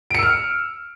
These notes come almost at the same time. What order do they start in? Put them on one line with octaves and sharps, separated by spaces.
D7 C#7 E6 F6